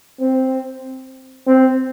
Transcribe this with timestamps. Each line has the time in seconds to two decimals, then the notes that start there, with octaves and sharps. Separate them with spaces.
0.20 C4
1.47 C4